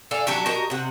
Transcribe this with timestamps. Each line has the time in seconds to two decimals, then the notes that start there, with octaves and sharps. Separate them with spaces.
0.11 A4 D5 F5 G#5
0.27 F#3 D4 F#4 G4
0.46 F#4 G4 A#4 D#5
0.70 C3 F#5